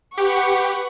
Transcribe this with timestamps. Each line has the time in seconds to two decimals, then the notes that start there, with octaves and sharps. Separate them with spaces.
0.17 G4 B4 F#5 C#6